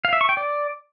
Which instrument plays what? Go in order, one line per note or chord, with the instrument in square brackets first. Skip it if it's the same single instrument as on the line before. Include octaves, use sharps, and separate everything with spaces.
[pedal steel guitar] F5
E5
C#6
G5
D5